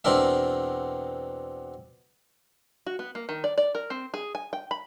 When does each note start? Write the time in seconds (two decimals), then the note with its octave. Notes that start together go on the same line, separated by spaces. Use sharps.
0.04 E2 B2 C4 D4 A#4 E5
2.86 F#4
2.99 B3
3.15 A#3
3.29 D#3
3.44 D5
3.58 D5
3.75 A#4
3.90 C4
4.14 G#4
4.35 G#5
4.53 G5
4.71 B5